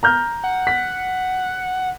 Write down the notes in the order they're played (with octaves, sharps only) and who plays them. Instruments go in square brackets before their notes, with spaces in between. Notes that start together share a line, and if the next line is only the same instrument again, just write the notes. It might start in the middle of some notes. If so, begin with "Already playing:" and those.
[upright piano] A#5 F6 G6
[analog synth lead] F#5
[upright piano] B6